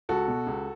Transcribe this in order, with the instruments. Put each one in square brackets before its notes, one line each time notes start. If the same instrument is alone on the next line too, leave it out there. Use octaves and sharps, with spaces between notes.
[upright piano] C#2 F#4 A4
B2
C#2